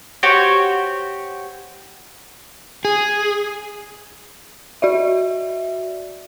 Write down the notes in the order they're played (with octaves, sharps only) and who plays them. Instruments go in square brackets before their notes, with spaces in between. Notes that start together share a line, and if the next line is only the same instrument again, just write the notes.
[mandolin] F#4 G4 C5 C#5
[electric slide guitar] G#4
[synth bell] F#4 D5 E5